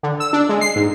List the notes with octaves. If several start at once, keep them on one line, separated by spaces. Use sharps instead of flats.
D3
E6
D4
G#3
C7
G#2